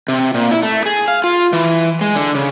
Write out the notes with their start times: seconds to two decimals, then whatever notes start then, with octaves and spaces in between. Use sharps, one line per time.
0.08 C3
0.34 A#2
0.51 E4
0.63 A3
0.86 G#4
1.08 F5
1.24 F4
1.53 E3
2.01 G#3
2.16 D3
2.35 C#3